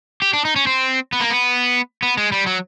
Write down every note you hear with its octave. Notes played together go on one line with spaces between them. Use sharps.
G4
D4
D#4
C#4
C4
B3
A#3
B3
B3
G#3
G3
F#3